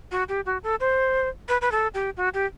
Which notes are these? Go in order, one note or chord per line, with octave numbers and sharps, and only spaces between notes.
F#4
G4
F#4
A4
C5
B4
B4
A4
G4
F#4
G4